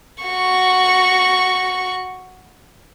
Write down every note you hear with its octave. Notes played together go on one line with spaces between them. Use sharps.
F#4 C#6